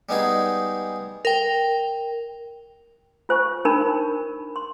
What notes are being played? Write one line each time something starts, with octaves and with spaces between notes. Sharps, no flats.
G3 G#3 B3 D#4 G#4
A#4 G5
F4 C5 G#5 C#6
D4 D#4 A#4 B5
C6